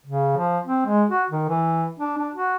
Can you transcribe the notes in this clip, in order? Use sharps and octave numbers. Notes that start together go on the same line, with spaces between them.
C#3
F3
C4
G#3
F#4
D#3
E3
D4
D4
F#4